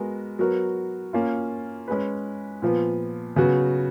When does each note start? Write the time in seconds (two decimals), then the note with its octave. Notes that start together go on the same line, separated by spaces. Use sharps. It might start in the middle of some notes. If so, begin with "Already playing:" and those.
Already playing: G#3 B3 F#4 A#4
0.39 F#3 B3 F#4 A#4
1.13 A#3 C#4 F4
1.88 G#3 C#4 G#4 B4
2.62 A#2 F3 B3
3.36 C#3 F#3 B3 F#4